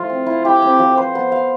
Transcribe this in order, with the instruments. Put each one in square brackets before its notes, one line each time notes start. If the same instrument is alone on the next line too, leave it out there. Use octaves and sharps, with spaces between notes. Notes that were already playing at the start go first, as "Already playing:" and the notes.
Already playing: [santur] F3 A3 E4 [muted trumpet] F4
[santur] C4
E4
[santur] E4 [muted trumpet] G4
[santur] C4
F3
[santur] B4 [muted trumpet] C5
[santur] B3
F5